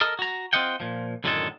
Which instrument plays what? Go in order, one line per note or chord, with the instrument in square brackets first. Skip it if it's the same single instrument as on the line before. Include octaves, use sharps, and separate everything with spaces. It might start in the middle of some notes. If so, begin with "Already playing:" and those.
[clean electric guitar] A4 A#4 D#5
F#4 A#5
C4 F4 D#5 F#5 G5
A#2 F3
F#2 A2 D3 D#3 G#3 A4